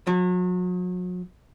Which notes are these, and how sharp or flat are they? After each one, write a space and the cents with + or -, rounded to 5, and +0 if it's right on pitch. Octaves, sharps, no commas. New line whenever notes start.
F#3 -40